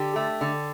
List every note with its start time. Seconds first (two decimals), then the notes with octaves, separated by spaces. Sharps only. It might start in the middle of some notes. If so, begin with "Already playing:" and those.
Already playing: D3 G4
0.16 A3
0.41 D3